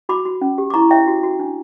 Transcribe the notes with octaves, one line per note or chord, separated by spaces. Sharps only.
F#4 B5 D6
F#4
C#4
G4
D6
E4 A#5 C#6
C#5 E5 G5
F#4
F#4
D4